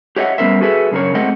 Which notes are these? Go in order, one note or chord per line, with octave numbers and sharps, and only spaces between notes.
G4 C#5 D#5 E5 F#5
G3 B3 C#4 A#4 C5 E5
F#4 G#4 A4 B4 E5
F#2 C#3 D4 A#4 C#5
G#3 A3 C4 C5 D#5 F#5